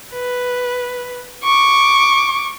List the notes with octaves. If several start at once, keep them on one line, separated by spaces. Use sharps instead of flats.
B4
C#6 D6